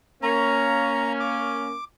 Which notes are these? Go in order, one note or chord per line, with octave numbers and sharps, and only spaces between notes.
A#3 C#4 A#5
D6